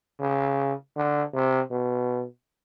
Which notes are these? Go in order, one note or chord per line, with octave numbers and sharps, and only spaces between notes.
C#3
D3
C3
B2